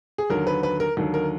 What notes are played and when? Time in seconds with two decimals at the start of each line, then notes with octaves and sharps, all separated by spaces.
0.18 G#4
0.30 D#2 D3 F#3 A#4
0.47 B4
0.63 B4
0.80 A#4
0.97 D#2 D3 F#3
1.14 A#4